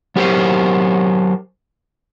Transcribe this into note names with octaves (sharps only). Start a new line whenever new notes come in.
F#3 G4 A#4 C5